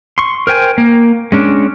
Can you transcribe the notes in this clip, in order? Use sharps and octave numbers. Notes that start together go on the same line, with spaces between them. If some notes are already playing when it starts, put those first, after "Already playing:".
C6 C#6
A#4 C5 G5 G#5
A#3
G#3 C#4 D4